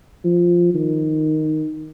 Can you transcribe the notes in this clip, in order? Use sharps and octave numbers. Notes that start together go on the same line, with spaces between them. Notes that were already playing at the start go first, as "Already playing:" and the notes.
F3
D#3